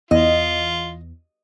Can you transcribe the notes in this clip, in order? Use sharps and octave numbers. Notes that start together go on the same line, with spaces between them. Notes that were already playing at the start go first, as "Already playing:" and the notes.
E2 F4 D#5